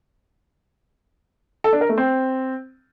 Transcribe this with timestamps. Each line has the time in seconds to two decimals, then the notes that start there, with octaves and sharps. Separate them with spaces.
1.64 A4
1.73 D4
1.81 A#4
1.89 A3
1.98 C4